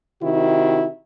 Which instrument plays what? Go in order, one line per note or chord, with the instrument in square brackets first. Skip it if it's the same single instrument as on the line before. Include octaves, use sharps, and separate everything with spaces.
[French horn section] C3 D#3 E4 F#4